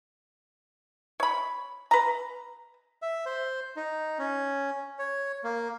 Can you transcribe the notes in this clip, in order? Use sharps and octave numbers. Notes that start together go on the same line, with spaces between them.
C#5 B5
B4 A#5
E5
C5
D#4
C#4
C#5
A#3